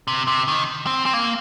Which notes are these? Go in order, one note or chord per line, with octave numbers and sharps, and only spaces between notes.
C3
C3
D#3
C4
C4
A#3